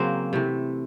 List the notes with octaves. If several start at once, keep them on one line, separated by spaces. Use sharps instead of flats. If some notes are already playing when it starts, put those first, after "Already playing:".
Already playing: C#3 F#3 A#3 C4
C3 E3 A3